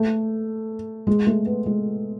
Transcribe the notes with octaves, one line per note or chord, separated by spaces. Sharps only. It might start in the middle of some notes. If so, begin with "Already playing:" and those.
Already playing: A3
G#3
A3
B3
G#3